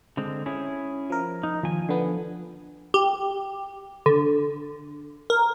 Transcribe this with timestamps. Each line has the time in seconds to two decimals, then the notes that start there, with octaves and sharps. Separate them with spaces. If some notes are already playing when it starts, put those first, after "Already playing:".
0.17 D3 G#3 C4
0.46 C#4 E4 G#4
1.10 F3 A#4
1.43 D#4
1.63 D#2 F3 G#5
1.89 D3 B3
2.94 G4
4.06 D3
5.30 A#4